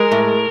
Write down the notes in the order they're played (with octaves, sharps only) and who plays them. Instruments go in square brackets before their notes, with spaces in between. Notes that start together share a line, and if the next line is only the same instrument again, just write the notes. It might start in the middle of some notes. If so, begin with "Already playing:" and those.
Already playing: [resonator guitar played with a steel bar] G#3 [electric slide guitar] A#4
[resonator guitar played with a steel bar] A2